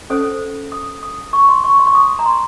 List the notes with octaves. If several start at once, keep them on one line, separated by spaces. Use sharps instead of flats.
C#4 A4 C5 D#6
D#6
D#6
C#6
C6
C#6
C6
C#6
D#6
A#5
C6